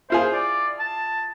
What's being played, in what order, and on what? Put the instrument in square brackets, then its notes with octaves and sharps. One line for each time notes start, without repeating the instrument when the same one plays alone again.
[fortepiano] E4 F4 G#4 [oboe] C5
[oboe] D5
A5